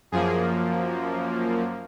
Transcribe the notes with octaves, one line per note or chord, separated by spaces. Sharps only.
F#2 F3 A#3 G#4